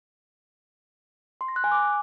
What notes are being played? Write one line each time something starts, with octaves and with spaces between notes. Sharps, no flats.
C6
A#6
F#6
G#5
D6